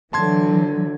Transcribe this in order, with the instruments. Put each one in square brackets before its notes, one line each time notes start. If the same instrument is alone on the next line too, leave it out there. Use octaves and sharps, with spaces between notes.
[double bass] D3 [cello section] E3 F#3 [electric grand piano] A5 C6 G#6